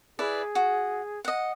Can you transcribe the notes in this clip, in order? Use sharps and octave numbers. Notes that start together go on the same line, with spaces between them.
E4 G#4 B4 D5
F#4
D#5 F#5